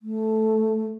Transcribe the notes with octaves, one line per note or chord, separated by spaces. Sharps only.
A3